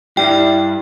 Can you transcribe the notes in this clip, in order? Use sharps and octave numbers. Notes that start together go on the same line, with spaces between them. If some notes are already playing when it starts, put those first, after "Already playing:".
G2 G3 E4 G5